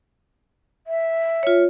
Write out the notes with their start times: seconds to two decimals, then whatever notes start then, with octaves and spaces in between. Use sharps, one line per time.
0.87 E5
1.43 F4 C#5